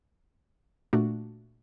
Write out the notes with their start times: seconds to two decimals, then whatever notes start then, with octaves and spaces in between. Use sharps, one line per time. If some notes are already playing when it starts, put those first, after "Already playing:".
0.93 A#2 A3 D4 F#4